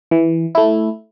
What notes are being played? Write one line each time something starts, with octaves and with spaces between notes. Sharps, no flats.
E3
A3 E4